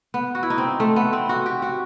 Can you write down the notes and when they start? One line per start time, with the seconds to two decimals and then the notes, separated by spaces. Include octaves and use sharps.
0.14 B3
0.35 F#4
0.43 E4
0.50 D#4
0.58 C4
0.80 A3
0.96 B3
1.13 C4
1.29 F#4
1.46 G4
1.62 F#4